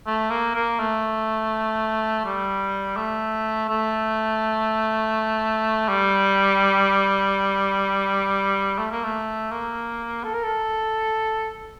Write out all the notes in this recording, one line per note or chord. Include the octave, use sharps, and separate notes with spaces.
A3
A#3
A#3
A3
G3
A3
A3
G3
A3
A#3
A3
A#3
A4
A#4
A4